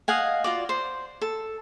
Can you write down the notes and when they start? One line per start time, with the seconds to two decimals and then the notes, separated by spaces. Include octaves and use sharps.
0.08 D#5 F5 F#5 G#5
0.44 F4 F#4 D5
0.69 C5
1.21 A4